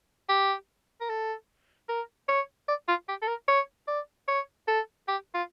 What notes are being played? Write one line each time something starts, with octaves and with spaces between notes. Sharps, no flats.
G4
A#4
A4
A#4
C#5
D5
F4
G4
A4
A#4
C#5
D5
C#5
A4
G4
F4